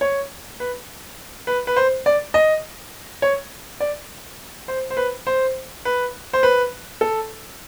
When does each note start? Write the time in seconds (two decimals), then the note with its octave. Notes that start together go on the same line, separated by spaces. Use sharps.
0.01 C#5
0.60 B4
1.47 B4
1.67 B4
1.76 C5
2.06 D5
2.34 D#5
3.22 C#5
3.80 D5
4.68 C5
4.90 C5
4.97 B4
5.27 C5
5.85 B4
6.33 C5
6.43 B4
7.01 A4